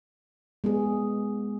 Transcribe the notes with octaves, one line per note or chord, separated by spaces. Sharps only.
G#3 B3 G#4